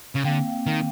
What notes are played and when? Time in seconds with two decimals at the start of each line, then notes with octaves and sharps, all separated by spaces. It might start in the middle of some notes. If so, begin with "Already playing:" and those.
0.15 C#3
0.24 D3 A#3 C4
0.66 D#3